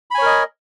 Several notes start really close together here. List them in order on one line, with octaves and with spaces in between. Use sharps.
B5 G#5 C#5 A#4 D#5